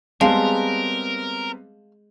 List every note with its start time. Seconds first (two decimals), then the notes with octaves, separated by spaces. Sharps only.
0.21 G3 G#3 B3 C4 A#4 F5 A5